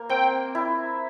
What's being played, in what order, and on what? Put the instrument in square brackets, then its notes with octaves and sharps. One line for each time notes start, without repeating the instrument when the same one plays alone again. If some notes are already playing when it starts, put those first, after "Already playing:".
Already playing: [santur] A#3
[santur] C4 [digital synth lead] G5
[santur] E4